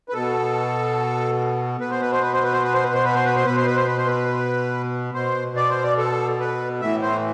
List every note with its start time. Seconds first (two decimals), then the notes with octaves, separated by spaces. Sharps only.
0.09 B4
0.14 B2 A4
1.80 B2 B4
1.91 C5
2.01 B4
2.12 C5
2.22 B4
2.33 C5
2.43 B4
2.53 C5
2.63 B4
2.74 C5
2.84 B4
2.94 C5
3.04 B4
3.14 C5
3.25 B4
3.36 C5
3.46 B2 B4
3.56 C5
3.66 B4
3.76 C5
3.87 B4
3.97 C5
4.07 B4
5.14 B2 C5
5.57 D5
5.70 C5
5.84 D5
5.98 A4
6.40 B4
6.81 A2 E3 E5
7.02 C5